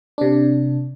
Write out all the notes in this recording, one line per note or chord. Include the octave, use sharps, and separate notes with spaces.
C3 D4